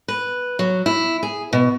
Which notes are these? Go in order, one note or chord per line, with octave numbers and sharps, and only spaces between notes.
B4
F#3
E4
G#4
B2